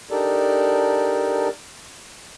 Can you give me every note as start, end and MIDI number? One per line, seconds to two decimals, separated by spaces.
0.11 1.48 62
0.11 1.48 63
0.11 1.48 67
0.11 1.48 69
0.11 1.48 70
0.11 1.48 74